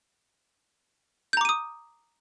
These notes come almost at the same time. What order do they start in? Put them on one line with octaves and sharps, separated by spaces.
G6 A#5 D6 D#7 D#6